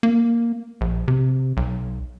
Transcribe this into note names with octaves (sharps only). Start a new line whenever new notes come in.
A#3
A#1
C3
B1